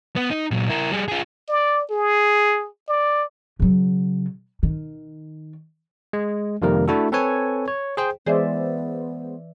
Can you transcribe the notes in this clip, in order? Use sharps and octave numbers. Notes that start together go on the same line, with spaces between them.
B3
D#4
A#2 F#3
E4 A#4
G3 G#4
F4 G#4
D5
G#4
D5
C#3 F#3
D#3
G#3
F2 C3 D#3 G3 A#3 A#4
A3 D4 E4 F#4 A4
C4 A4 B4 C#5 G#5
C#5
G#4 C5 G5
E3 G#3 B3 G#4 C5 D5 E5